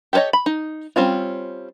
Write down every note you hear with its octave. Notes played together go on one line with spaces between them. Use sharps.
G4 A4 B4 C#5 D#5
B5
D#4
G3 C4 C#4 F4